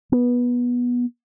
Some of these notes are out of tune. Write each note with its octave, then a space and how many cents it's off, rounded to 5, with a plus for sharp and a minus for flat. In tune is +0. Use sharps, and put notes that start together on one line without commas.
B3 -15